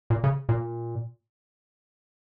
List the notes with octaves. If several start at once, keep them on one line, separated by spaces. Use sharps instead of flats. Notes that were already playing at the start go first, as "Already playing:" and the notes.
A#2
C#3
A#2